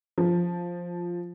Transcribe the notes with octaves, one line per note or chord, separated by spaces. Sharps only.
F3